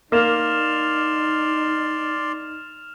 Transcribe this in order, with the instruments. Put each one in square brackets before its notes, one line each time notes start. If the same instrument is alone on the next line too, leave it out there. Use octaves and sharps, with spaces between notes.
[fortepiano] A#3 [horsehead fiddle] D#4 [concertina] D5 C6 [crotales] F6 E7 F7